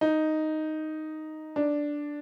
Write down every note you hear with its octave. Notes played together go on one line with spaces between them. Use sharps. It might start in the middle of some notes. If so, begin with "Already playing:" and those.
D#4
D4